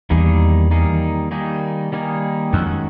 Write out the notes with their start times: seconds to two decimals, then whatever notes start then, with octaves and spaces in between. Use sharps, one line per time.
0.10 E2 D#3 G3 A#3 D#4 G#4
0.71 D#3 G3 A#3 D#4 G#4
1.31 D#3 G3 A#3 D#4 G#4
1.92 D#3 G3 A#3 D#4 G#4
2.53 F2 D#3 G#3 C#4 F#4